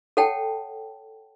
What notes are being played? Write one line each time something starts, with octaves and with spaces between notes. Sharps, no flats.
A4 C#5 F#5 G5 A5